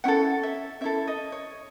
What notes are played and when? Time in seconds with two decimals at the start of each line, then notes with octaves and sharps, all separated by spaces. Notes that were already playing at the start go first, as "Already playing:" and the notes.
0.04 C#4 E4 A4 F#5
0.43 E5
0.81 C#4 E4 A4 E5
1.07 D#5
1.32 C#5